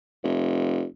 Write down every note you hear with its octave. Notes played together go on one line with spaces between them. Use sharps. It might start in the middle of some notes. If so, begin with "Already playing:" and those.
F1